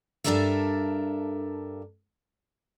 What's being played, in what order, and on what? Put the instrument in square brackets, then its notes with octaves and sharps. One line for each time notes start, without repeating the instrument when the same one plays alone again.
[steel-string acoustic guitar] G2 D4 A4 A#4 D5 E5